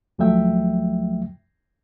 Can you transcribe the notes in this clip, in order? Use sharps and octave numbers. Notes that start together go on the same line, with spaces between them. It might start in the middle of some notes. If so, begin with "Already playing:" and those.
D2 F3 F#3 A3 E5 G5